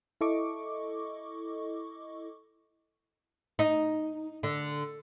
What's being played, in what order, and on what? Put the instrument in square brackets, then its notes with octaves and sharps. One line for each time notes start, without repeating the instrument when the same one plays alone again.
[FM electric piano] E4 A4 D#5 C#6 D6
[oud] D#4
D3